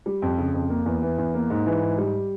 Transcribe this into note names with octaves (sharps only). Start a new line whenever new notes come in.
G3
F2
C#3
F2
A#3
E2
E3
E2
A#3
G#2
E3
G#2
G3